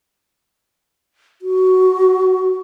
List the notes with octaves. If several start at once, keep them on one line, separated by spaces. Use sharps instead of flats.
F#4